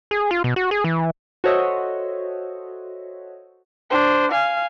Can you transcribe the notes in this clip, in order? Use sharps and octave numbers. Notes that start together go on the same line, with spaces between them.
G#4
F4
B2
F#4
G#4
E3
F#4 A4 C5 C#5 D#5 E5
D4 C5
F5 G#5